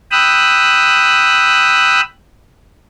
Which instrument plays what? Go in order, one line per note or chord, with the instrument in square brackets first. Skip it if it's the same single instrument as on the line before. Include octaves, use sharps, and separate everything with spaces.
[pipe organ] G5 B5 D#6 E6 F#6